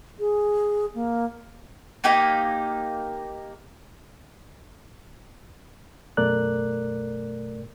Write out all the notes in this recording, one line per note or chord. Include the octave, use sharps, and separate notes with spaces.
G#4
A#3
A#3 D#4 G4 D#5
F#2 B2 A3 A#4 D5 F#6